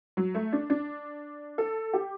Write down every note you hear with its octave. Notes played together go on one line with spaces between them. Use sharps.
F#3
A3
D4
D4
A4
G4